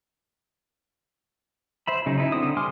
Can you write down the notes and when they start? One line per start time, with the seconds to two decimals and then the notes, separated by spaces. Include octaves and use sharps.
1.87 C5 E5 B5
2.06 C#3 F#3 D#4
2.18 D#4 E4
2.32 D3 C4 D#6
2.57 G3 G#5 C6 D6 F6